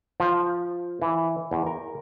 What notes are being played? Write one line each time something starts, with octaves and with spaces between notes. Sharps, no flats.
F3
E3
E2
A#4